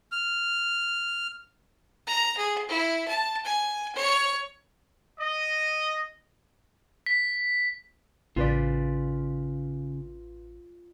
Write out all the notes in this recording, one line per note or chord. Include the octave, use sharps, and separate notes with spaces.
F6
A#5
G#4
E4
A5
G#5
C#5
D#5
B6
A1 C#3 F4 B4 D5